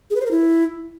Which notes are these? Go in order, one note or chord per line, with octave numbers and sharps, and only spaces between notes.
G#4
B4
C5
A#4
E4